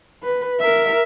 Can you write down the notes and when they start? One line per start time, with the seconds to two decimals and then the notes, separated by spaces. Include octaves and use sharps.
0.23 B4
0.60 A#4 E5